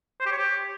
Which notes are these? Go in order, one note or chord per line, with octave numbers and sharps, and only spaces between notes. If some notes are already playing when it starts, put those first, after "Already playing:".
C5
G4
C#5
G4